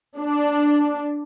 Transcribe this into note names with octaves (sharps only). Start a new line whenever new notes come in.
D4